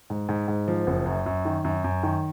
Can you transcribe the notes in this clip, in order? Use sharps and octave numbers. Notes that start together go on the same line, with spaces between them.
G#2
G#2
G#2
F3
F#1
F#2
F#2
D#3
F#2
F#2
D#3